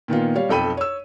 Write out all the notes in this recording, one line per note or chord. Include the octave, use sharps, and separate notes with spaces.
A#2 D#3 B3 F4
G3 C#5 F5
B1 F2 A4 G5 B5 D#7
C#5 E6